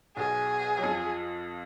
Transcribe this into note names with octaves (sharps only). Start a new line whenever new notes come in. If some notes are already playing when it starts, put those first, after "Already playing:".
B1 B2 G#4
F#3
F2 F3